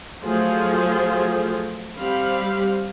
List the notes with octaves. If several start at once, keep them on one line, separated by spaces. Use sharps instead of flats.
F3 F#3 A3 F4 G#4 C5
G3 C4 F5 B5